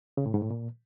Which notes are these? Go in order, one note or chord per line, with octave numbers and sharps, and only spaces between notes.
C#3
A2
G#2
A2
A#2